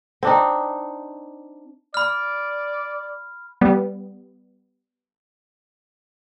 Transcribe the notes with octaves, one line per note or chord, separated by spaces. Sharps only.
C4 D4 D#4
D5 B5 F6
G3 B3